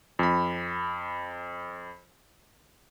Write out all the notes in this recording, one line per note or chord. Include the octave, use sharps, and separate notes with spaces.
F2 B5